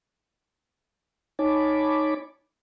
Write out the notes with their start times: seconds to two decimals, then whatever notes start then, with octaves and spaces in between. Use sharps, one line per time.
1.39 D#4 C#5 G#5 A5 B5 D6